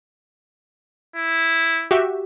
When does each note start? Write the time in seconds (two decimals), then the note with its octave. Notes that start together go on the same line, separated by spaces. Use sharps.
1.16 E4
1.91 F#4 G4 E5